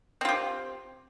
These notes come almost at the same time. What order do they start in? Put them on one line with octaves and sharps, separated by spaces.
C4 F4 G4